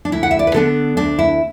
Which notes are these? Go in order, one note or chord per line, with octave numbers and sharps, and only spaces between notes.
D4
D2 E4
F#5
E5
D5
B4
D3 B3 D4 A4
D2 D4
E4